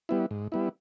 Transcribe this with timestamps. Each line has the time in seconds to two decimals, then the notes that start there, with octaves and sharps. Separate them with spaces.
0.09 G3 B3 E4
0.31 G#2
0.52 G3 B3 E4